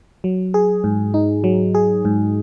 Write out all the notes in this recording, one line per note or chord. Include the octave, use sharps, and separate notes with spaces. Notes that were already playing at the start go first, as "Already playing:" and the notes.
F#3
G#4
G#2
D#4
F#3
G#4
G#2